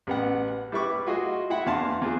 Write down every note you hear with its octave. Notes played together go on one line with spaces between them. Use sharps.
A1 B3 F#5
G3 E4 B4 C#6 D6
F4 F#4 G#4 D#5
E4 E5 F#5 B5
E2 D4 F5 A5 C6
E2 F4 G#4